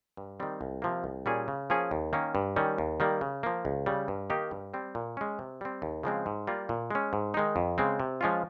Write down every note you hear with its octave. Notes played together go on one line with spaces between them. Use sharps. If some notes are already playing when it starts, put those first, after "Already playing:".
G2
D#3 G3 C4
C2
C3 F3 A#3
C2
A#2 G3 C#4 G#4
C#3
F3 A#3 C#4 G#4
D#2
D#3 A#3 C#4
G2
D#3 G3 C#4
D#2
D#3 G3 A#3
C#3
F3 A#3
C#2
C#3 G3
G2
D#3 A#3 D#4 G4
G2
G3 C4
A#2
G#3 C#4
C3
G3 C4
D#2
C#3 F3 G#3 C4
G#2
G3 A#3 F4
A#2
G#3 C#4
G#2
D#3 G#3 D#4
F2
C#3 G#3 C4
C3
F3 G#3 C#4 F4